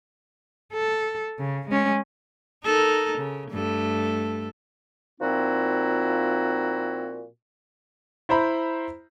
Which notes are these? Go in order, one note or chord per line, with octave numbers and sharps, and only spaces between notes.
A4
C#3
G#3 C#4
D#4 A4 A#4
C#3
G2 A3 A4
A#2 F3 C4 D#4 E4 F#4
E4 C5 A#5 B5